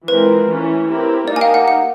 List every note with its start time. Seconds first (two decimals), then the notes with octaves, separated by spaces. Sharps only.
0.08 E3 G#3 C4 F4 A#4 B4
0.48 E3 A3 C#4
0.88 C4 E4 G4 A#4
1.28 A#3 D#4 G4 D5
1.36 G#5
1.41 F5 G5
1.54 F#5
1.68 F#5